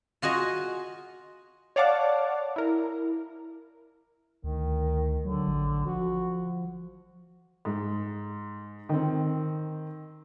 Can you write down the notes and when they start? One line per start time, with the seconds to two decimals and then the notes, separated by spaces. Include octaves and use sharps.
0.22 F4 F#4 G#4 D#5
1.76 C#5 D5 F5 F#5 A5 D6
2.56 E4 A#4
4.44 D2 D#3
5.25 D3 F#3
5.48 A1
5.85 F3 F#4
7.65 G#2
8.89 D#3 C4